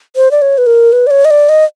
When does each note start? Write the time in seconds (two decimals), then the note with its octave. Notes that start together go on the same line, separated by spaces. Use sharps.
0.16 C5
0.31 D5
0.42 C#5
0.58 B4
0.66 A#4
0.92 B4
1.07 D5
1.11 C#5
1.25 D#5
1.31 D5
1.49 D#5